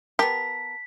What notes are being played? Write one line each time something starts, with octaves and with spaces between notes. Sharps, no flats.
B3 G4 A#4 A5 B6